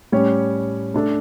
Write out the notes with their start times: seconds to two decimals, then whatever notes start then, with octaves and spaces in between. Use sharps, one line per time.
0.12 A2 G3 C#4 G4 C#5
0.94 A3 D4 A4